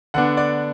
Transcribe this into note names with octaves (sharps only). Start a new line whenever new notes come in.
D3 B3 D4 F#5
D5